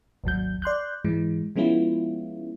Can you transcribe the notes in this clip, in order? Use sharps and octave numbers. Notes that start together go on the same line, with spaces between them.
G#1 D#2 F#3 G6
D5 C6 F#6 G6
G#2 E3 G#3
F3 G#3 B3 C#4 E4 F4